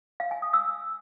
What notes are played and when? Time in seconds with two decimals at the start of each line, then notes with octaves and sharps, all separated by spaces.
0.20 F5
0.31 G#5
0.42 D#6
0.53 E6